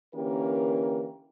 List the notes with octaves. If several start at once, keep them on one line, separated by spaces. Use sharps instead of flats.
D3 E3 A#3 C#4 G4 A#4